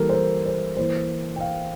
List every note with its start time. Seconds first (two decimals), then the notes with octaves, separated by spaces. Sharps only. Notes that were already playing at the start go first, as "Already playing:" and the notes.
Already playing: E3 G3 A#3 A4 A#4
0.09 C5
0.14 A#4
0.46 C5
0.77 E3 A#3 C5
1.36 G5
1.41 F5